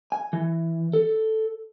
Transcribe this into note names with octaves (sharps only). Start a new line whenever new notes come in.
G#5
E3
A4